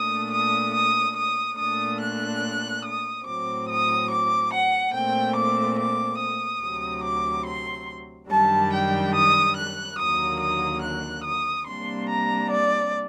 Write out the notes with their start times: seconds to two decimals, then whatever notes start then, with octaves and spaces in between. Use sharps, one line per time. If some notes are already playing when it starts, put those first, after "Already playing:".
Already playing: A#2 A3 D4 D#6
0.31 D#6
0.73 D#6
1.15 D#6
1.57 A#2 A3 D4 D#6
2.00 F#6
2.84 D#6
3.25 A2 F#3 C4 D6
3.68 D#6
4.10 D6
4.52 F#5
4.93 A#2 A3 C4 G5
5.35 D6
5.78 D6
6.19 D#6
6.62 D2 C3 F#3
7.03 D6
7.45 C6
8.29 F#2 D#3 G3 D4 A5
8.72 G5
9.14 D#6
9.55 F#6
9.98 D#2 D3 F#3 A#3 D#6
10.39 D#6
10.82 F#6
11.24 D#6
11.66 C3 G3 A#3 D4 C6
12.08 A#5
12.50 D5